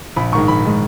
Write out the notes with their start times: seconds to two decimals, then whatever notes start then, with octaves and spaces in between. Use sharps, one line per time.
0.17 A#1 B5
0.32 G#2 D#3 G#3 C#6
0.48 A#1 B5
0.65 D#3 G#3